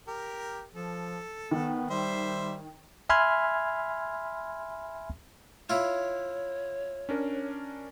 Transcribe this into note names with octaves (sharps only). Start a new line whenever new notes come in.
G4 A#4
F3 A4
D#3 B3
G3 C5 E5
E5 G#5 B5 C6 F6 G#6
E4 F4 C#5
C#4 D4 A#4